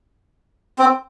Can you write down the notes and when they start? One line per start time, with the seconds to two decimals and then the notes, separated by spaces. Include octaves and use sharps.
0.79 C4